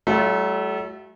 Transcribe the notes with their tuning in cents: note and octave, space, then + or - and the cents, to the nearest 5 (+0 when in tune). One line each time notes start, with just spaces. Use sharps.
F#3 +40 A3 -30 F4 -25